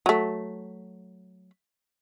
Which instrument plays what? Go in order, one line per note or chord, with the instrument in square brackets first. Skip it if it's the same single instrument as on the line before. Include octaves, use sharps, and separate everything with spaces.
[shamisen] F#3 A3